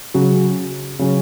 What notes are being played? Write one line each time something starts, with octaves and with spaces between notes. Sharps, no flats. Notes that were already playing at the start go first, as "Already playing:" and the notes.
C#3 F#3 C#4 F#4
C#3 F#3 C#4 F#4